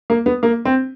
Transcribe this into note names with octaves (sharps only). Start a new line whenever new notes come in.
A#3
B3
A#3
C4